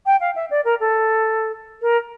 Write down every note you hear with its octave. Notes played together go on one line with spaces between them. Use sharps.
G5
F5
E5
D5
A#4
A4
A#4